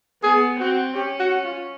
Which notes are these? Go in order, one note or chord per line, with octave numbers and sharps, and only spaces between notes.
B3 G#4
C4 F#4
C#4 G4
F#4
F4